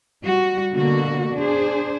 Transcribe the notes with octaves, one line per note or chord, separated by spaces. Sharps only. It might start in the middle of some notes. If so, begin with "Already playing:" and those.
G3 F#4
B2 D3 A#3 F#4
D4 G#4 C5